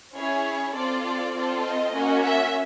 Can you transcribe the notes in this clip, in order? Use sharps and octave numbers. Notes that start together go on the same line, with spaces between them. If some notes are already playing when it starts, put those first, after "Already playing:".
C#4 E4 G#4 C#5
C4 F4 A4 D5
D5
C4 F4 A4
D#5
A#3 C#4 F#4
E5